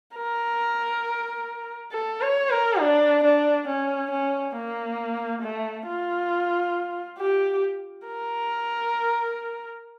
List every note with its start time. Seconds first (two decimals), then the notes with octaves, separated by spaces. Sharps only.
0.16 A#4
1.92 A4
2.22 C#5
2.50 A#4
2.79 D4
3.24 D4
3.68 C#4
4.11 C#4
4.56 A#3
5.43 A3
5.87 F4
7.19 G4
8.07 A#4